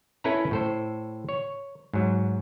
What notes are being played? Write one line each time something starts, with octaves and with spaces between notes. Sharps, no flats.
C#4 E4 A4 B4 E5 A#5
A2 A4 C5
C#5
G#2 F#3